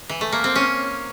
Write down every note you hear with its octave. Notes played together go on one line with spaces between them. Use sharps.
E3
A3
A#3
C4
C#4